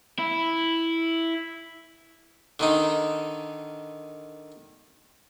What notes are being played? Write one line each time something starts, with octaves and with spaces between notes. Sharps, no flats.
E4
D3 D#3 D#4